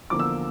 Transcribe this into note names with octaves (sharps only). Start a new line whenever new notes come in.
E2 D3 F3 A#3 D6
E6